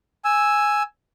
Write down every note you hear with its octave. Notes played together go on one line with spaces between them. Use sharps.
G#5 E6